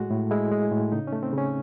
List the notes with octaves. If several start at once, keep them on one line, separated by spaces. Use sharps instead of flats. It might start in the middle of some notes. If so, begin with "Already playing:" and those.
Already playing: A2 G#3 F#4
A2
G#3 E4
G#3
A2
C#3 D#4
C#4
A3
C4
C#3
C#4